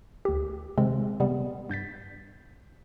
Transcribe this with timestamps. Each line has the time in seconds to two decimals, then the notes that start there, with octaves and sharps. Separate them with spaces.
0.25 D2 G4
0.78 C3 D#3 G#3 C4
1.20 C3 G3 B3
1.70 G2 G6 A6 B6